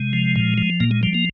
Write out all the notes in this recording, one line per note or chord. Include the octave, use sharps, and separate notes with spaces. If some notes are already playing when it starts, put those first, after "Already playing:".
Already playing: C3 G#3
F3
A#2
F3
A#2 A#3
G#3
F3 G3
A#3